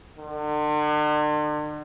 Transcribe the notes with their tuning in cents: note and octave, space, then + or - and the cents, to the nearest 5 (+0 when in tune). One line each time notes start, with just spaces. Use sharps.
D3 +40